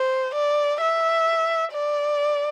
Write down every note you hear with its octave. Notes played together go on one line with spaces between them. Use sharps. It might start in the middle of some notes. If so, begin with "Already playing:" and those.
Already playing: C5
D5
E5
D5